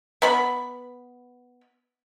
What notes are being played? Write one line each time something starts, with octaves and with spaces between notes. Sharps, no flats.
B3 B5